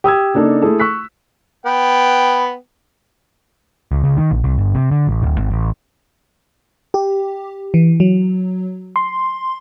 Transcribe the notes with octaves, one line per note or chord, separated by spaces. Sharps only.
G4 D#6 E6 G#6
C#3 A#3 D4 D#4 A4
A3 E4 G#4 A4
C#6 E6 F#6 B6
B3 G5
C#2
C#2
D#3
A#1
C2
G1
C3
D3
A1
D1
G#1
A1
G4
E3
F#3
C6